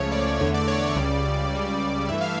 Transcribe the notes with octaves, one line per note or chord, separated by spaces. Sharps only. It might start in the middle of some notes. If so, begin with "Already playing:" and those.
Already playing: C#2 C#3 F3 A3 C#5
D5
E2 D3 A3 C#5
D5
C#5
D5
C#2 C#3 G3
C#2 C#3 G3
G2 E3 A3 E5
F5